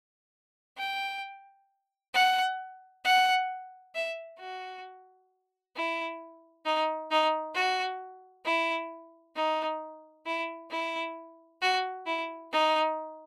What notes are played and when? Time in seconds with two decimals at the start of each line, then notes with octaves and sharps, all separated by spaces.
0.78 G5
2.14 F#5
3.04 F#5
3.95 E5
4.39 F#4
5.75 E4
6.65 D#4
7.11 D#4
7.55 F#4
8.46 E4
9.36 D#4
10.26 E4
10.71 E4
11.62 F#4
12.06 E4
12.52 D#4